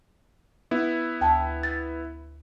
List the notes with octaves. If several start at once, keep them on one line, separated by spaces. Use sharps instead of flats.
B3 E4
D2 G5 A5
A6